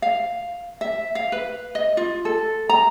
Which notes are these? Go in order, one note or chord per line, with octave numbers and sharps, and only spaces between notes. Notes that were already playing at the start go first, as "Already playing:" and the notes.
F5
E5
F5
B4
D#5
F4
A4
A#5